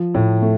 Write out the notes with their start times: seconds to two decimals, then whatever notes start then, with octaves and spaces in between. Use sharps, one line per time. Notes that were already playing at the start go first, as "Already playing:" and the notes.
Already playing: F3
0.15 A2
0.42 A3